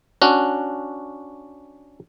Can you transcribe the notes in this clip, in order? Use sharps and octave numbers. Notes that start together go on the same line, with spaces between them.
C#4 D4 F#4